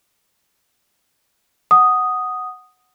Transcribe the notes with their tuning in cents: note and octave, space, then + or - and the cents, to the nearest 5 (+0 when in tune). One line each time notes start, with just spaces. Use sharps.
F#5 +0 D#6 +0